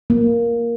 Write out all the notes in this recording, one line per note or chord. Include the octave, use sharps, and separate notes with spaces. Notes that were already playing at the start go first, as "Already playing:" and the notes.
A#3